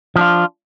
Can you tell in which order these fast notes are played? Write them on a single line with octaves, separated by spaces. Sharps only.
F3 D4 F4